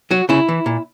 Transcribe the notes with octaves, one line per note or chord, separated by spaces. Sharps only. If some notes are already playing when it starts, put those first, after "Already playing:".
F#3 F#4
C#3 E4
E3
A#2